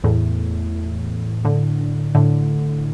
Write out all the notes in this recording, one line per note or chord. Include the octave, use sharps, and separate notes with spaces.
E2 A2
A2 D3
A2 D3